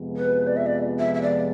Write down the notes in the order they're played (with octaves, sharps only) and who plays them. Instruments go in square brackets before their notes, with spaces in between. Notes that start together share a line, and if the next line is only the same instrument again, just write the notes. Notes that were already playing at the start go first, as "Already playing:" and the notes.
Already playing: [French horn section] F2 C3 F3 G#3 B3
[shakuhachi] B4
D5
E5
D5
E5
E5
D5